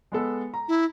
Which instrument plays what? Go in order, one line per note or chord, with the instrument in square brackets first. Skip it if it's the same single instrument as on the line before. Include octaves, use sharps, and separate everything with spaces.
[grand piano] G#3 B3 A4
A#5
[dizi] E4